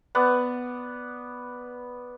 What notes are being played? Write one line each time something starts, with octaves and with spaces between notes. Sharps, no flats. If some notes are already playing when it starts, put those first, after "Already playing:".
B3 D5 F#5